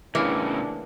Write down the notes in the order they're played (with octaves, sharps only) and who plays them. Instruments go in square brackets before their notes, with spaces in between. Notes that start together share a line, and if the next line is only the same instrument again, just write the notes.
[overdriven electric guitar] A2 C#3 [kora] E3 [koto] A#3 [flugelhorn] D4